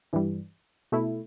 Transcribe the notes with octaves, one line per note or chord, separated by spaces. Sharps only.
G2 E3 G3
B2 A3 E4